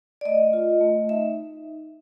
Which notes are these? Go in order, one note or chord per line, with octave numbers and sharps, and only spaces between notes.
D5
A3 D#5
F4
A3
D#4 E5